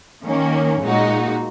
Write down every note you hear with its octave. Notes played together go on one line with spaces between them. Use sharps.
D#3 A#3 C#4
A#2 G#3 D#4 F#4